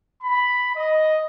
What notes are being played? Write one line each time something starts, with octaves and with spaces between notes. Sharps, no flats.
B5
D#5